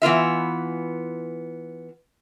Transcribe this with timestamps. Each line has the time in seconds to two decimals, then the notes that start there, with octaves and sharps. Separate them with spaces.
0.02 E3 B3 F4 E5